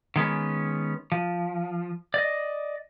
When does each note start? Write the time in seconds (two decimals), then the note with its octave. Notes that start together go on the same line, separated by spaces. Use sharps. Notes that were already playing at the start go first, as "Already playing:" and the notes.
0.16 D#3 G#3 B3 C#4
1.12 F3
2.14 D5 D#5